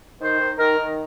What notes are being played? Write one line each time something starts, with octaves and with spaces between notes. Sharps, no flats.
D#3 C5
D#3
D#3 A#4
D#3